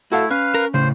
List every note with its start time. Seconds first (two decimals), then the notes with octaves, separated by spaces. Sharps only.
0.12 A3 E4 F#4 A4 F5
0.30 C#4 B4 F5
0.54 A#4
0.74 A2 C#3 C5